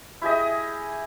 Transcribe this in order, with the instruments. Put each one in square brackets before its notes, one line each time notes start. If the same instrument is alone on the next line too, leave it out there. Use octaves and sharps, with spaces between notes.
[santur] E4 G4 G#4 D#5